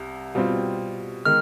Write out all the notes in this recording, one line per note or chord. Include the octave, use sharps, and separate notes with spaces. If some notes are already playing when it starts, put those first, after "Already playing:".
Already playing: C2 C3
B2 G3 C4 F4
D#3 G#3 F6